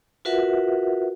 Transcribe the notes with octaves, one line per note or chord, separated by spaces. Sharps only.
F4 F#4 A#4 B4 E5 F#5